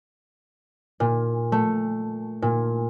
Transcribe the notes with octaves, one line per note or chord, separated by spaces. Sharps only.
A#2
A3
A#2